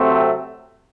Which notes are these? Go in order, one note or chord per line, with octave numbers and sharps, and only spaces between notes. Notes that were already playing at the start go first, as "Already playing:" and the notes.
Already playing: C3 F#3 A3 C4 C5